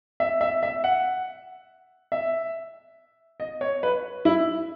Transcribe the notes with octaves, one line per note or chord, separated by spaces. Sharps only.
E5
E5
E5
F#5
E5
D#5
C#5
B4
E4